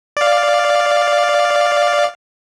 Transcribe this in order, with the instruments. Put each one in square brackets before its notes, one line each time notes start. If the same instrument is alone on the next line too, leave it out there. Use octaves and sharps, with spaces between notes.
[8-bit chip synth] D5 F5